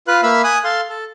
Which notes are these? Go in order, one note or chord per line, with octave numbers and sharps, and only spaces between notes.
F4 B4 F5 F#6
A#3 E5 F5 B5 E6
G#5 D#6 F#6
A4 F5 C6
A4